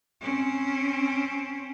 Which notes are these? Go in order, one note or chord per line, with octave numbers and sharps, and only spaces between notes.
C4 C#4